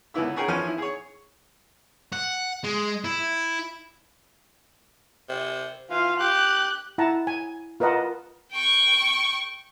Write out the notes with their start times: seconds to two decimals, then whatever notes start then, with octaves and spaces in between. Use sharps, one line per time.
0.14 C#2 D3 B3 E4 E6
0.36 C#4 F#4 G#4 A#4 G5
0.48 E2 E3 F3 C#4 G#5 F6
0.67 E4
0.78 G#4 C#5
2.13 F#5
2.64 G#3
3.04 E4
5.29 C3
5.90 E3 F4 F5
6.20 G4 F#6
6.98 E4 F#5 A5 A#5
7.27 G#5
7.80 F4 A#4 B4 D#5 F#5 A5
8.52 G5 C#6